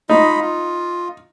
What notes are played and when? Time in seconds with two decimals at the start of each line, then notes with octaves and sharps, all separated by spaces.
0.10 D#4 F4 D#5 B5
0.41 F4